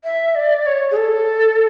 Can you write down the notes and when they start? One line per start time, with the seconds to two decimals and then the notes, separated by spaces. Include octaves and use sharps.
0.04 E5
0.35 D5
0.66 C#5
0.91 G#4
0.97 A4